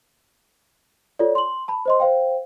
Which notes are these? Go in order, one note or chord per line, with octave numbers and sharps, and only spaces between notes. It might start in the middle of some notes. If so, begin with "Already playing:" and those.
F4 A4 C#5 D5
C6 F#7
A5 B5
C5 D#5 C6
C5 F5 G5